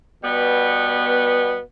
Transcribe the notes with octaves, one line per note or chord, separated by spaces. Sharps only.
B2 G3 B3